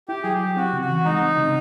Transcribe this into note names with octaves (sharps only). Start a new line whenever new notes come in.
E4 G4
F#3 G#4
G4
F#3
C4 F#4
C#3
F#4
E3
G#3 D#4
C4
C#3